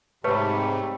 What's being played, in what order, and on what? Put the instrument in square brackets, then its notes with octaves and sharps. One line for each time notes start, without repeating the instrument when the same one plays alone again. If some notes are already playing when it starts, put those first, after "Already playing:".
[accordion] G#2 C3 [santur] G3 A3 [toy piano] B4 C#5